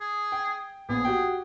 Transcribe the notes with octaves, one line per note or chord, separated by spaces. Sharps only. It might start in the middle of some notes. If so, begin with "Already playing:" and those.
G#4
G5
A#1 B3 G#4
F#4 G4 G5